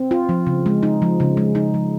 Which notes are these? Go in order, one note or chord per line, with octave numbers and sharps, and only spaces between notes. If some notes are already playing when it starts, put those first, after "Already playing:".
Already playing: C4
F4
F3
C#3
G#3
D#4
F3
C#3
G#3
D#4
F3